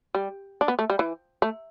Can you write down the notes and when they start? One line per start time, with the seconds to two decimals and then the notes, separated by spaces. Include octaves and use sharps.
0.15 G3
0.61 D4
0.68 B3
0.79 A3
0.90 G3
0.99 E3
1.42 A3